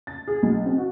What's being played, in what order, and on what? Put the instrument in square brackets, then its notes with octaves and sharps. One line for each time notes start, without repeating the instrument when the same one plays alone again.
[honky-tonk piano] A6
G#4
B1
C4
F#4